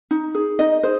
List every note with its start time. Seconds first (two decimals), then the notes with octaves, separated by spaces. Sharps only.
0.11 D#4
0.35 G#4
0.59 D#4 D#5
0.83 G#4 C5